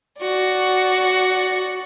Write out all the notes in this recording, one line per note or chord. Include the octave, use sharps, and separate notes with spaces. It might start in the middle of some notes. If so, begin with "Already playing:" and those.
F#4 D5